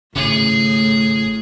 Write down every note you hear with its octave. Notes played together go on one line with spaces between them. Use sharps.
G#1 A2 C#3 G#4